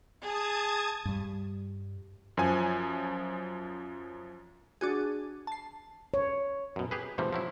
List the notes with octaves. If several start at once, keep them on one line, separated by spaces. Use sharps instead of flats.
G#4 A5 D#6 G#6
G2 G3
F#2 F3 G#5
D4 F#4 G#4
A5 C7
C#5
F#2 B2
G4 G#4 B4
G#2 C3 E3 F3 G3 A3
F3 F#3 E4